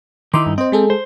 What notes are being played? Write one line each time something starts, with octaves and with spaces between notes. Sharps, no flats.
D#3 D#4 E4 C6 D6
G2
C4 C5 D#5
G#3 G#4 A4
C5